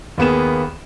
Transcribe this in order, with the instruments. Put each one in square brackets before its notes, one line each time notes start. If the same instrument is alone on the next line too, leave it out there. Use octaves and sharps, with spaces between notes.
[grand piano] D#2 A#3 B3 G#4 E7